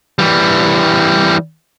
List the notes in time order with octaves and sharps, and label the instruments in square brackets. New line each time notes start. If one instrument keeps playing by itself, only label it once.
[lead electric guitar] E3 G3